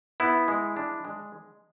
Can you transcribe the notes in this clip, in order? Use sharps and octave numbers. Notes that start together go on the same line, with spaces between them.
B3 E4
G#3
D4
G#3